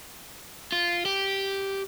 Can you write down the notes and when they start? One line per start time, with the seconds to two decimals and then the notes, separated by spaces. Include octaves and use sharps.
0.72 F4
1.05 G4